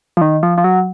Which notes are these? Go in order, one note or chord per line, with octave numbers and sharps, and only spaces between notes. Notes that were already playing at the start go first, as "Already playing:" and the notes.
F3
D#3
F3
F3
F#3